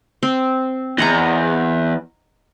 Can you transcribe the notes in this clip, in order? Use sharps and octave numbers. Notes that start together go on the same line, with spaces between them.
C4
E2 D#5 F#5 A#5